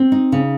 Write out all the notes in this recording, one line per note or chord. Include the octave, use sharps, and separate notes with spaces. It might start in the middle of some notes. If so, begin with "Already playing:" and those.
Already playing: C4
D#4
C#3